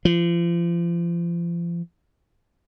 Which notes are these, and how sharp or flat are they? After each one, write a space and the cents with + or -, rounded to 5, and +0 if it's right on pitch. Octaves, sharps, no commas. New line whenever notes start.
F3 -35